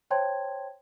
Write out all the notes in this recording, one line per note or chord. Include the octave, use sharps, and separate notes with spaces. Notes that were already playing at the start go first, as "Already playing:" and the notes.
C5 C#5 G5 A5 C6 G#6